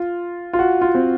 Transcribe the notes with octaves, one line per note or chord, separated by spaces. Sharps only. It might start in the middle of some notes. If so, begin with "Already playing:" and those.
Already playing: F4
F4
F#4
F4
C4